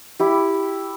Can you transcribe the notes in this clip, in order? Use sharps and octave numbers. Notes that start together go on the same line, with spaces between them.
E4 G4